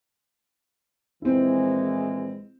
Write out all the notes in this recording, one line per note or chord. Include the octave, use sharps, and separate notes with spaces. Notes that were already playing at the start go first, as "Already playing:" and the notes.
A#1 E3 G#3 C4 E4